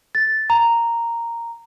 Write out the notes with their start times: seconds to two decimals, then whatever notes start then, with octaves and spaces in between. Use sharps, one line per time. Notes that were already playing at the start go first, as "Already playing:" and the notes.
0.15 A6
0.50 A#5